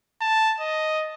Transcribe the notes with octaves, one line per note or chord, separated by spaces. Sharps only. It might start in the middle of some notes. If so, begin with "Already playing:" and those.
A5
D#5